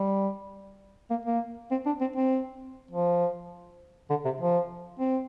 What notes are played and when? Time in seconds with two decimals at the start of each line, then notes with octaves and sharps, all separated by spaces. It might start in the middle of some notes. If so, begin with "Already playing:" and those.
Already playing: G3
1.10 A#3
1.26 A#3
1.71 C4
1.86 D4
2.00 C4
2.16 C4
2.91 F3
4.10 D3
4.25 C3
4.40 F3
5.00 C4